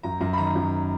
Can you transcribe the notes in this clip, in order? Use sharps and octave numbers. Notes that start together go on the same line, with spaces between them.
F#2 A#5
F#2 A#5
B5
D#3 A#5
F#2